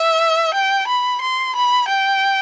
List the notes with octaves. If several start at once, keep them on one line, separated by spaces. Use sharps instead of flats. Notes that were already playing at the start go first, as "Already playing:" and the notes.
Already playing: E5
G5
B5
C6
B5
G5